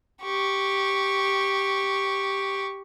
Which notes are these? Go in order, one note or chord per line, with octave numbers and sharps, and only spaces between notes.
G4 C#6